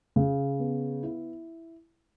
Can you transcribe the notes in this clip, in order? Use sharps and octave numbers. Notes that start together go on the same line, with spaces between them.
C#3
B3
E4